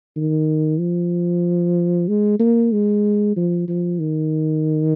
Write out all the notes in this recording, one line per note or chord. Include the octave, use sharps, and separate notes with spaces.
D#3
F3
G#3
A#3
G#3
F3
F3
D#3